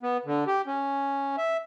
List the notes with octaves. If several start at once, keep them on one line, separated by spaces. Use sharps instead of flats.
B3
D3
G4
C#4
E5